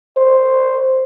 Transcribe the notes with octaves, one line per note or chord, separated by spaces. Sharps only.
C5